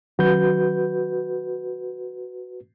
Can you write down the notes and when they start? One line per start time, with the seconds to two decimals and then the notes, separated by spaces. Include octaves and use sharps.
0.19 D#3 F#3 C#4 F#4 B4 G6